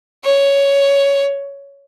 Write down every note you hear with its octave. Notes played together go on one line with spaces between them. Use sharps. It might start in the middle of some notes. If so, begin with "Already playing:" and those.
C#5